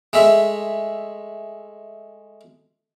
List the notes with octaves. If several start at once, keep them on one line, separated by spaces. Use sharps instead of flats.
G#3 A3 E5